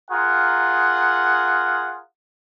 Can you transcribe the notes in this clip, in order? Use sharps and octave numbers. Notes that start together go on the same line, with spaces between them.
F4 G#4 A#4 F#5